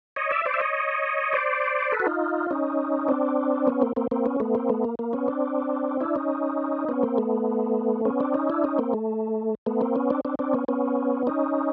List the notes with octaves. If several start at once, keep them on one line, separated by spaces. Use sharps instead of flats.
C#5 D#5
D5 E5
C5 D5
E5
C#5 D#5
C5 D5
A4 B4
F#4
D#4 F4
C#4 D#4
C4 D4
B3 C#4
A#3 C4
A#3 C4
A#3 C4
B3 C#4
A3 B3
A#3 C4
A3 B3
A#3
A#3
B3 C#4
C4 D4
D4 E4
C#4 D#4
B3 C#4
A#3 C4
A3 B3
B3 C#4
C4 D4
C#4 D#4
D4 E4
C#4 D#4
A#3 C4
A3
A3 B3
A#3 C4
B3 C#4
C4 D4
C4 D4
C4 D4
B3 C#4
B3 C#4
C#4 D#4